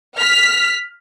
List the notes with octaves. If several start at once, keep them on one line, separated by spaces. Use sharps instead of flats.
F6 B6